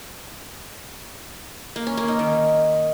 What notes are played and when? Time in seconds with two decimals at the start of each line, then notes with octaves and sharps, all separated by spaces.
1.76 A#3
1.87 C#4
1.97 A#3
2.08 D#4
2.19 D#3